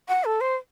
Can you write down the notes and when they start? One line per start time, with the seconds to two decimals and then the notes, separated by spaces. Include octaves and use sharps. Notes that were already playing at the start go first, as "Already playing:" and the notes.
0.08 F#5
0.25 A4
0.41 C5